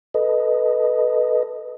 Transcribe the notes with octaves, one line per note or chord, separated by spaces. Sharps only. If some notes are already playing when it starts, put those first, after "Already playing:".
A4 B4 D#5